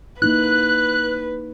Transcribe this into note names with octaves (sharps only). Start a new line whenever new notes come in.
A#3 D#4 E4 B4 F#6